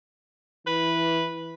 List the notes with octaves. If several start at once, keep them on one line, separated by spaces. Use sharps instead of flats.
E3 B4